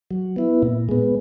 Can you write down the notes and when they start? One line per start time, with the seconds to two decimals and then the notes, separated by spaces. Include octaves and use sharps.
0.11 F#3
0.36 B3 E4
0.63 A#2
0.89 G#3 B3